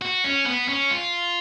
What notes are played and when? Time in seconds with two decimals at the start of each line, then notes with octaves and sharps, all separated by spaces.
0.02 F#4
0.24 C#4
0.46 B3
0.68 C#4
0.91 F4